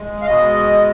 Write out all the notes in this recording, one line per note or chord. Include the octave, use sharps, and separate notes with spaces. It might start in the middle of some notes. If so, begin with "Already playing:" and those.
Already playing: G#3
F5
B2 G#3 D#5